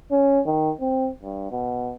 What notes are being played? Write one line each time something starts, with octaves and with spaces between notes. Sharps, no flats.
C#4
D#3
C4
G2
B2